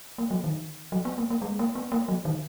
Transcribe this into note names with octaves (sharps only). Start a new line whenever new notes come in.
A#3
F#3
D#3
F#3
B3
A#3
A#3
G#3
A#3
B3
A#3
F#3
D#3